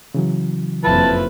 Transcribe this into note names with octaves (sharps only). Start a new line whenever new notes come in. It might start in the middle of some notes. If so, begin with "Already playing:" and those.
C#3 E3 F#3
F#1 F2 E4 F4 B4 A5